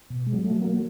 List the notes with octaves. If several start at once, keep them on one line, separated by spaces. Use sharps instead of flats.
B2
G#3
F#3
A3
F#3
A#3